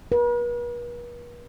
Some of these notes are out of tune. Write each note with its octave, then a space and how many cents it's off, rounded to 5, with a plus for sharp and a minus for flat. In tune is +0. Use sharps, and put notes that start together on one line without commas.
B4 -45